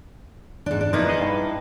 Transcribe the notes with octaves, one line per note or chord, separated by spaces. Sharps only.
G#2 D4
D4
F3 A#3 B3 D#4 E4 B4
G#4 D#5 F#5
G2